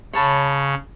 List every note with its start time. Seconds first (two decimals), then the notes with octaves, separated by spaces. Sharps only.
0.13 C#3 C#5 A5 B5